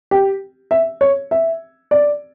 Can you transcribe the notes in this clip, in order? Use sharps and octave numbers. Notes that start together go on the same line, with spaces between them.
G4
E5
C#5
E5
D5